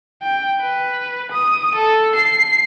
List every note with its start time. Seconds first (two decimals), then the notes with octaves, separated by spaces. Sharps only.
0.22 G5
0.60 B4
1.32 D#6
1.75 A4
2.16 C7